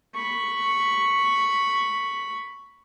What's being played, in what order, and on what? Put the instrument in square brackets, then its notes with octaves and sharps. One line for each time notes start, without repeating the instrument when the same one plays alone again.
[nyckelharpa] B5 C#6